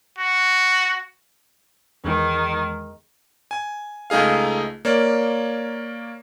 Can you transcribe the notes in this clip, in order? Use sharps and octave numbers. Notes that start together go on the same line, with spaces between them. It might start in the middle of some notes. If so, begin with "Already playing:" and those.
F#4
E2 D#3 G#3
G#5
C#2 A3 D#4 G#4 F5
A#3 C#5 D5